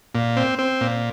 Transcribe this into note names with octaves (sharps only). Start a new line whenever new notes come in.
A#2
C4
C4
A#2